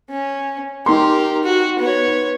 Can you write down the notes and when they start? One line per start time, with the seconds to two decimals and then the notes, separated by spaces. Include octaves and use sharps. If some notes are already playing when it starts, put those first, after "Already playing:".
0.10 C#4
0.86 D#4 G4 A#4 C6
1.44 F#4
1.79 B3 C#5